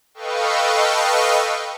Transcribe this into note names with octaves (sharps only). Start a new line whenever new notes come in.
A4 B4 D#5 F5 G5 C#6